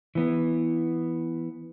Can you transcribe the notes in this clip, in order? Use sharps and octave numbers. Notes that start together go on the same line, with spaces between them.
E3 B3